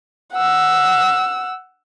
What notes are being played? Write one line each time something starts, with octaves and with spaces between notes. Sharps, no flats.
F#5 E6